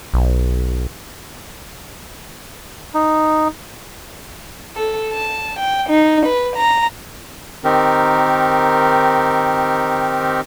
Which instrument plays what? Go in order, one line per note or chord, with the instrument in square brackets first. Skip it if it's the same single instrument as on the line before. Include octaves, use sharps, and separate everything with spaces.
[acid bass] B1
[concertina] D#4
[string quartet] A4
A5
G5
D#4
B4
A#5
[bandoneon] D#3 C4 D#4 G4 A#4